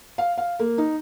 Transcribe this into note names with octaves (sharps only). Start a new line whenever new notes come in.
F5
F5
A#3
D#4